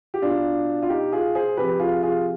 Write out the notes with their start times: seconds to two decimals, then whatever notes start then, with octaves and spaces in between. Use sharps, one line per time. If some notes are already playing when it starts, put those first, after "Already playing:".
0.14 G4
0.22 B2 D4 F4
0.82 F4
0.89 D#4 G4
1.12 F4 G#4
1.35 G#4 C5
1.57 C3 F3 G4 B4
1.80 F4 G#4
2.03 F4 G#4